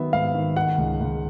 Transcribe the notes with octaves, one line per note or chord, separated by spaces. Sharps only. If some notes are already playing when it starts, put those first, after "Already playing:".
Already playing: D#3 F#3 B3 E5
G#2 F5
D#3
D#3 F#5
C#2
C#2